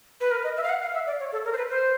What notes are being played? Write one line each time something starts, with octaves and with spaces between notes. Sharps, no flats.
B4
A#4
D#5
E5
F5
F#5
F5
E5
D5
C#5
A4
A#4
C5
B4
C5